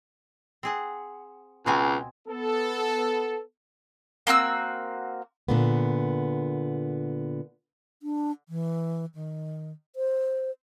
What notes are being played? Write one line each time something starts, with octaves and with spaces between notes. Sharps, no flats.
C4 G#4 F#5
C#2 B2 C4 G#5
B3 A4
A#3 C4 F#4 E6
A#2 D3 B3
D4
E3
D#3
C5